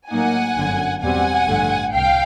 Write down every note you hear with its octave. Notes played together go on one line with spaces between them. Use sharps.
A2 F#3 A#3 D#4 F#5 G#5
G1 F#2 D3
E2 B2 G3 C4 F#5 G#5
A1 G2 D3 F3 A3
C2 F5 G5